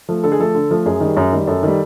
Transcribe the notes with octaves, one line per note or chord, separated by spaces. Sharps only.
F3 A3
D3 A4
G#4
F3 A3 A4
D3
F3 A3
F#2 G#4
D#3 G3
F#2
D#3 G3
F#2 A4
D#3 G3